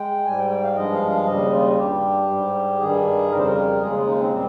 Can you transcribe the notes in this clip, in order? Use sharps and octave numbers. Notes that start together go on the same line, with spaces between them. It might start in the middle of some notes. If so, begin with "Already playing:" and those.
Already playing: G#3 G5
G#2 G3 G#5
G5
G5
F5
G2 F3 G#3 D#5
F5
F5
D#2 C#3 G3 D#5
F4
G2 G3 G4
G#2 G3
G2 D#3 G3 G#4
F2 C#3 G3 A#4
C5
A#4
D#2 C#3 G#3 G#4
F4
D#4
C4
A#2 G3 C4